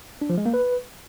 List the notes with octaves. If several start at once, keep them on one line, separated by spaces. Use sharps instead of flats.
D4
F3
G#3
A#3
B4